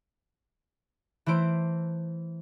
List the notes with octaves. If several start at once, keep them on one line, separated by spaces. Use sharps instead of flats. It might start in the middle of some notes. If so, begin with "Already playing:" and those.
E3 A3 E4 C5 D7